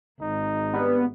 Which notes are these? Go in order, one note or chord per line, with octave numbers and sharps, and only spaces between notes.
G#1 D#4
G2 B3